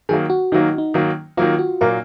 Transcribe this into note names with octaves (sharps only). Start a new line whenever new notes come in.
D#3 F#3 A#3 G#4
F#4
D#3 F#3 A#3 D#4
D#4
D#3 F#3 A#3
D#3 F#3 A#3 F4
F#4
A#2 F#3 A#3 A#4